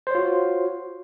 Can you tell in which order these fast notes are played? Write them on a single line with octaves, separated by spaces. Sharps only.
C5 C#5 F4 F#4